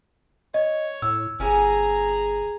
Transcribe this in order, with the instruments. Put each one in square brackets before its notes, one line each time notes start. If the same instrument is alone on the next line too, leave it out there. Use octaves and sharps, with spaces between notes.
[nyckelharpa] C#5 [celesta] D#5
[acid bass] A2 [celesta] E6
[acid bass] G1 [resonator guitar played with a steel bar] F3 C#4 G#5 [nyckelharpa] G#4 A#5